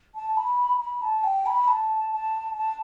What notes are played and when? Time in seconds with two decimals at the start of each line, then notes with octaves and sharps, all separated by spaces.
0.15 A5
0.37 B5
0.80 B5
1.02 A5
1.24 G5
1.46 B5
1.68 A5
2.11 A5
2.55 A5